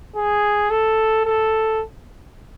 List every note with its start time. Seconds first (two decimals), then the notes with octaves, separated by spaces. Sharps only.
0.16 G#4
0.70 A4
1.25 A4